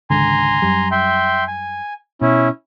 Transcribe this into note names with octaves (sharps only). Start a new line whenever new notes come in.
G#1 C#2 D3 G#5 A#5 C6
F#2 G3
E5 G5 C6
G#5
B2 C#4 E4